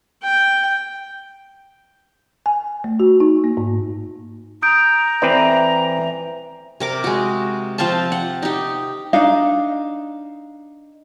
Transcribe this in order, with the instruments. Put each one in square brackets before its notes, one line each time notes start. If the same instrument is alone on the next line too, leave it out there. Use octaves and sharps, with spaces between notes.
[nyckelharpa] G5
[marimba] G#5
A3
F#4
D#4
A#3
G#2
[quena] A#5 [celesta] D#6 G6 D7
[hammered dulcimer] E3 [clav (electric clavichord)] C4 B4 D5
[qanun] C3 A#4 D6
G#3 F#4
F3 C4 F5 A5
F#5
D#4 G4
[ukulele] D4 D#4 F5